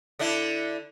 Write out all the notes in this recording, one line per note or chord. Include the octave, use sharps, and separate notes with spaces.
D3 D4 E4